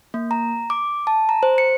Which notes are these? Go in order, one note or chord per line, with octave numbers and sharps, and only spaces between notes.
A#3
A#5
D6
A5
A#5
C5
C#7